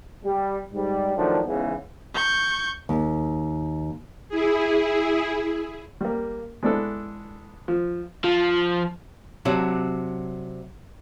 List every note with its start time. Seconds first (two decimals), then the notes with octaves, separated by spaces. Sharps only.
0.25 G3
0.73 G#2 G3
1.16 D#3 F3 F#3 A3 D4
1.46 E2 G#2 C#3 E3 B3
2.14 C#6 G6
2.89 D#2
4.29 E4 G#4
6.01 G3 A#3
6.63 G#3 B3 D4 E4 A4
7.68 F3
8.24 F3
9.45 C3 F#3 D4